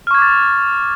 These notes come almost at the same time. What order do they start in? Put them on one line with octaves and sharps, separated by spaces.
F6 C#6 G#6 D6 A6